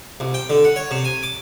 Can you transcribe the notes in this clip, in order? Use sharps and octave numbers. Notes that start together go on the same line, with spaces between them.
C2
G5
D3
F#5
C#5
C3
G#5
D6